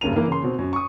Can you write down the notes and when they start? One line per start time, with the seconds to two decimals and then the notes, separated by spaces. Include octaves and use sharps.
0.01 F#1 G2 C#3 A#4 D#7 F7
0.16 E3 A#3 A#4
0.28 C#3 C6
0.43 B2 C4
0.59 F#2
0.73 C#6 D#6